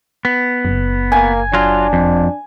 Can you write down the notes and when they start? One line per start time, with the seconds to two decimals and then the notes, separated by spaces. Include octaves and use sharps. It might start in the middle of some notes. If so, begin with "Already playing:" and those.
0.25 B3
0.65 F#1
1.12 A#3 G#5
1.54 F#3 D4 F4
1.93 F2